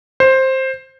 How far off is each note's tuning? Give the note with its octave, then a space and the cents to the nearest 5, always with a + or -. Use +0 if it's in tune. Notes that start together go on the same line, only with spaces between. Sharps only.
C5 +10